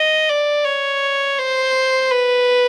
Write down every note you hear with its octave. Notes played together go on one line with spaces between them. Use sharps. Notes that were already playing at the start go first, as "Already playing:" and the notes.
Already playing: D#5
D5
C#5
C5
B4